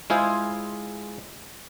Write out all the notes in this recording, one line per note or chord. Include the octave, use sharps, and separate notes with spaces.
G#3 E4 F4 G#4 C5